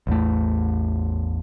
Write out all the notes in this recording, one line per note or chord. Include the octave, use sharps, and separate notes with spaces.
A1 E2 A3